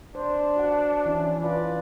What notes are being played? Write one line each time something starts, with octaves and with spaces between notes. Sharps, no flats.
D4 C5
F#4 F#5
E3 C#4 E4
F4 B4 D5